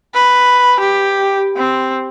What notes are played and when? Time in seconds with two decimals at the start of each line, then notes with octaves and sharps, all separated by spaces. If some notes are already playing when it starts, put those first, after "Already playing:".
0.14 B4
0.80 G4
1.57 C4